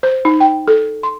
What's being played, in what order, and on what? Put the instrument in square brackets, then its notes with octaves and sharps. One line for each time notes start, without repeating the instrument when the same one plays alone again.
[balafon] C5
D#4
G5
A4
C6